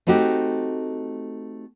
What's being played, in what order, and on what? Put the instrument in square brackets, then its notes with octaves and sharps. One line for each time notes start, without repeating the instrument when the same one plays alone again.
[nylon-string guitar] A3 C4 D#4 F#4 G4